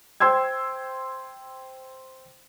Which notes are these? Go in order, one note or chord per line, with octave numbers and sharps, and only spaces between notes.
C5 G5 C6 E6 G#6